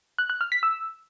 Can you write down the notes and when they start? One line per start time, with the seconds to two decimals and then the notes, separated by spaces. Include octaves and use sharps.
0.18 F#6
0.30 F#6
0.41 F6
0.52 B6
0.63 E6